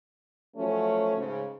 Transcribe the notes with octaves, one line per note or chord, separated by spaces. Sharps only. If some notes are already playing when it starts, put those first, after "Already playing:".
F3 F#3 A3 C#4
G#2 C#3